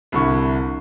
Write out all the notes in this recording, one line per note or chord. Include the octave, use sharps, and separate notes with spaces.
C2 D3 E4 C#6